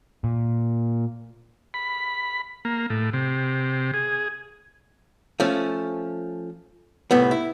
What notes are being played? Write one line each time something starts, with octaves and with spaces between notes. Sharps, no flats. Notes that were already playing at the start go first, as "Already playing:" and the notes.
A#2
B5
A#3
A2
C3
G#4
F3 A3 C#4
C2 A2 B3
E4